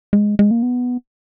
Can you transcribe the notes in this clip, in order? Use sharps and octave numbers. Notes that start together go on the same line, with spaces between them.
G#3
G#3
A#3
B3